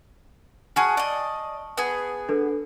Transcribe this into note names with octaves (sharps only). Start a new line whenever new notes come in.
F#4 G#4 A5 C#6 F6
D5 D#5
B3 G#4
D4 A4 B4